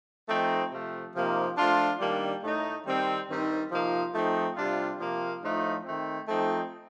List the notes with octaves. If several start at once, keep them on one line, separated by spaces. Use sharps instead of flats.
F3 A3 C4 D#4
C3 F3 A3
C3 F3 A#3 D#4
F3 A3 D4 F4
D#3 G3 A#3 D4
A2 A3 D#4
D#3 G3 C4
G2 D#3 G3 C4 D#4
C3 F3 A#3 D#4
F3 A3 C4 D#4
C3 G3 D4 F4
C3 F3 A#3
A2 F3 A3 D#4
D#3 A3 C4
F3 A3 C4 D#4